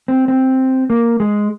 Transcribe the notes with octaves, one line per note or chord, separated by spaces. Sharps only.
C4
C4
A#3
G#3